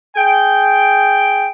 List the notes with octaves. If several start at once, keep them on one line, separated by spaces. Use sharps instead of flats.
G#4 G5